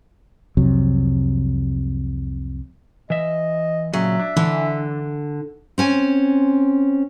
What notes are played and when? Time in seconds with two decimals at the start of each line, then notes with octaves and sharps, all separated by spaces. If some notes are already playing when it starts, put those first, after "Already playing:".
0.57 C2 F2 C3 F#3
3.10 E3 D#5 E5
3.93 A#2 C#3 F#3 G#4 E5
4.20 D4
4.37 D3 E3
5.78 C4 C#4 G#5